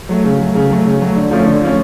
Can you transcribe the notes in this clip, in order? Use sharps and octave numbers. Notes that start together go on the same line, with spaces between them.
F#3 A3
C#3
F#3 A3
C#3
F#3 A3
C#3
F#3 A3
D3
F3 A3 C#4
D3
F3 A3 C#4